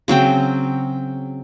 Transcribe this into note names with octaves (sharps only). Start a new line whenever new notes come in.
C#3 F#3 C4 G5